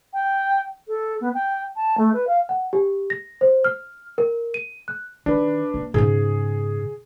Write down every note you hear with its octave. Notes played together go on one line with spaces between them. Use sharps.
G5
A4
B3
G5
A5
A3
B4
F5
F#5
G4
A#6
C5
F6
A#4
D#7
F#6
D#3 D4 B4
A#3
G#2 C#3 G#4